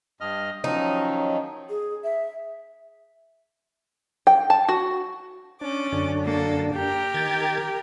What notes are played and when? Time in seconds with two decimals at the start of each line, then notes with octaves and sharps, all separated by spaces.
0.21 G2 D#5 F6
0.64 D#3 F3 F#3 C#4 D#4
1.69 G#4
2.04 E5
4.27 G5
4.50 A5
4.69 F#4
5.61 C#4 D4 D6
5.92 F#2 D3 D4
6.23 A#3 A4
6.74 G4 A#4 G5
7.14 D#3 G#6 A6